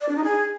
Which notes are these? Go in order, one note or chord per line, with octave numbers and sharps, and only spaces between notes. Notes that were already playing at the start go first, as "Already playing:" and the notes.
D5
D4
D#4
G#4